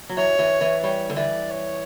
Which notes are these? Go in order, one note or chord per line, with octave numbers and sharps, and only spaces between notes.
F#3
E3 C#5
E3
E3
G3 C#5
D3
E3 D5
C#5